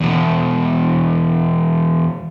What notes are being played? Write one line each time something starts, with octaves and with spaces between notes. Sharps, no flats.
E2 B2